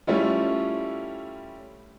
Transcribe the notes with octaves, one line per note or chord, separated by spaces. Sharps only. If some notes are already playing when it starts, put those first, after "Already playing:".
G3 A3 C#4 E4 F4